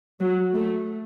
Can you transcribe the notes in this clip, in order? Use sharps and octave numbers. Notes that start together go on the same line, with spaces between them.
F#3
A3